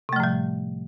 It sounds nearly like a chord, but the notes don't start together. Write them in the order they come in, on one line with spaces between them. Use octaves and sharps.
C3 A3 F3 A2 G3